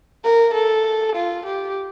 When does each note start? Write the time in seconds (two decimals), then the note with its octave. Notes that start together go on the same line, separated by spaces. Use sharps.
0.24 A#4
0.54 A4
1.16 F4
1.46 G4